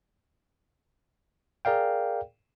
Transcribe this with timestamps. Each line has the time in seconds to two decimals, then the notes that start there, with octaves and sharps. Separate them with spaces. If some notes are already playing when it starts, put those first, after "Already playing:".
1.65 G#4 A#4 D5 F5 G5